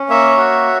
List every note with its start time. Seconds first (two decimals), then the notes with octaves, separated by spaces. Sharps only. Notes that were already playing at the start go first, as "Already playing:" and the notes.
Already playing: C#4
0.09 A#3 C#5 E5
0.37 F#4